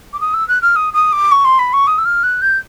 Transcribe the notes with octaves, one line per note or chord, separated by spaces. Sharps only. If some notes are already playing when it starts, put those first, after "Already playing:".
D6
D#6
E6
F#6
F6
D#6
D#6
D6
C#6
C6
B5
C#6
D#6
E6
F6
F#6
G6